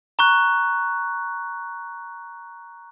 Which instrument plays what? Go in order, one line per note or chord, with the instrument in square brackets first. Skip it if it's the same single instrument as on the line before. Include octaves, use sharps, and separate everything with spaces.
[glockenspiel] A#5 C#6 F#6